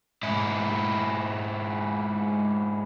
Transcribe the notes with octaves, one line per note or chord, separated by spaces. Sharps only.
G#2 E4